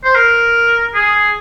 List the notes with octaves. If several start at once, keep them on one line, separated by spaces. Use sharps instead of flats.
C5
A#4
G#4